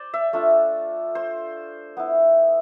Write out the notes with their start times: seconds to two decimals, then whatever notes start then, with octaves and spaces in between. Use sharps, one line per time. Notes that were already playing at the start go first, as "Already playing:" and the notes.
Already playing: C5 D5
0.14 E5
0.33 A3 D4 F4
1.15 C5
1.97 B3 E4